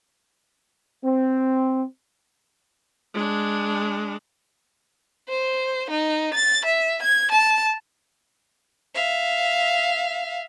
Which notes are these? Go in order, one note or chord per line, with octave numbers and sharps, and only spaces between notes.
C4
G#3 D4
C5
D#4
A6
E5
G#6
A5
E5 F5